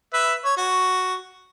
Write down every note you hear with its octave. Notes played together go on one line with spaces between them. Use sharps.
B4 E5
C#5
F#4